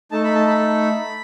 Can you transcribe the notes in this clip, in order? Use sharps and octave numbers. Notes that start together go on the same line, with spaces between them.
A3 D#4 A4 A5
B5
A5
B5